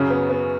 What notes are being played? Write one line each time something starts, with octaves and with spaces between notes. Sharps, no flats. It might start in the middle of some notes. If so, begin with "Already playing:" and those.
Already playing: F#2 C#3 F#3 C#4
B3
B3